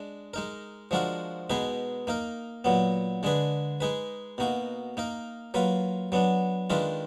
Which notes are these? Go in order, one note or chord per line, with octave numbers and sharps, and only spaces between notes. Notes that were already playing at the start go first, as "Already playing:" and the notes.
Already playing: G#3 D4
G#3 D#4 A#4
F3 G#3 D4 F#4 A#4
B2 G#3 D#4 G#4 B4
A#3 D#4 A#4
A#2 F#3 B3
D3 G#3 D4 G#4 B4
G#3 D#4 G#4 B4
B2 A#3 D#4 F#4
A#3 D#4 A#4
F#3 A#3 F4 B4
F#3 B3 D4
D#3 G#3 D4 F4 B4